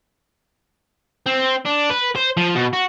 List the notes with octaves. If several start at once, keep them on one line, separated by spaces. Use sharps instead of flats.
C4
D4
B4
C5
F3
B2
F#4